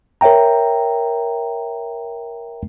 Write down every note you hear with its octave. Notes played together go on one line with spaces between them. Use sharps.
A#4 C#5 E5 G5 A#5